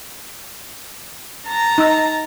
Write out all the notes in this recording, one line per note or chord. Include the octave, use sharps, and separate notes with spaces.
A5 A#5
D#4 E6